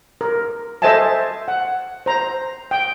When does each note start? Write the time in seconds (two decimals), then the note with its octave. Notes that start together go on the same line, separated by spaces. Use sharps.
0.21 A#4
0.82 A4 C5 D#5 E5 G#5 A5
1.48 F#5
2.06 C5 A#5
2.71 G5